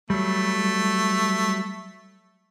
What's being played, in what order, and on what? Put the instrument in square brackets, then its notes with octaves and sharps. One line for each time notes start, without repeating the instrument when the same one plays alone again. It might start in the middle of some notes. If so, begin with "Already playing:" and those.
[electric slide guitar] F#3 G3 [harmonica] A3